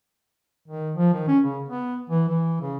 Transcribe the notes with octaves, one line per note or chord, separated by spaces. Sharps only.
D#3
F3
D#3
C#4
C#3
B3
E3
E3
C#3